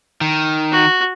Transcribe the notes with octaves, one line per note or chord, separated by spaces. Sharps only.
D#3
F#4